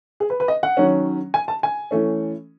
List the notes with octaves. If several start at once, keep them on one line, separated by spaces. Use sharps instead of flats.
G#4
B4
B4
D#5
F#5
D#3 F#3 C#4
G#5
A5
G#5
E3 A3 C#4